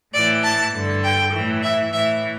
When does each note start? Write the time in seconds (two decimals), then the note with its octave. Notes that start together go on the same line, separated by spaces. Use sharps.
0.14 A2 E3 D5
0.43 A5
0.74 G2 D3
1.04 G5
1.33 A2 E3
1.63 E5
1.93 A2 E3 E5